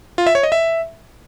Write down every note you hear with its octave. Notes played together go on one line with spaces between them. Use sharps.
F4
E5
C#5
D#5
E5